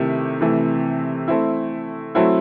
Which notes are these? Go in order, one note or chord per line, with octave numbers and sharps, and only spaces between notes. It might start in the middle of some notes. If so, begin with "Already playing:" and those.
Already playing: C3 D#3 A3 E4 G4
C3 E3 A3
A3 C4 E4
F#3 A3 C4 E4